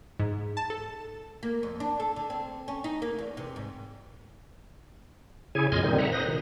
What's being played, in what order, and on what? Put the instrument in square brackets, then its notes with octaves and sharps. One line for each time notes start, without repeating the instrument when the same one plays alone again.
[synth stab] G#2
A5
A4
[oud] A#3
F2
D4
A4
D3
C4
C#4
D#4
A#3
E2
C3
G#2
[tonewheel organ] C#3 E4 G#4 C#5 G#5
F2 A#2 D#5 C6 F6 G#6
A#2 D3 D#3 G3 C4 D#4
E5 F#5 A#5
B4 C5 D#6 A#6
B2 D#3